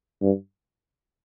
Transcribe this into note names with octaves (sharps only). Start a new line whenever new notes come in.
G2